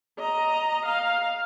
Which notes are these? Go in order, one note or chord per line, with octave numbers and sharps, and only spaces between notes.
D#5 A#5
F5